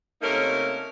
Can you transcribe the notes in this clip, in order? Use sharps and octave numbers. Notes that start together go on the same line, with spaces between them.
C3 A3 A#3 C#4 D#4 A#4